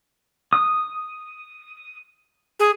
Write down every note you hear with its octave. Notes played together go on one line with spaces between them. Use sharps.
D#6
G#4